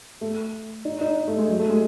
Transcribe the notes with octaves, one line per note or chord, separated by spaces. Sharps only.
A3
D#4
D#4
A3
G#3
F#3
A3
G#3